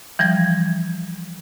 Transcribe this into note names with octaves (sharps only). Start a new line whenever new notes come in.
E3 F3 G3 G#6